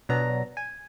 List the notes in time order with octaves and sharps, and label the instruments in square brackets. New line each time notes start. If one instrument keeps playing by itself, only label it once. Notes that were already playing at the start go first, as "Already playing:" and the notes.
[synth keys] B2 F#3 B3 D4 A#5
G#5